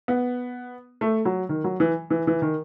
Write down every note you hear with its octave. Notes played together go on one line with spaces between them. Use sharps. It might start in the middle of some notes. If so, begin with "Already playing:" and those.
B3
A3
F#3
D#3
F#3
E3
E3
E3
D#3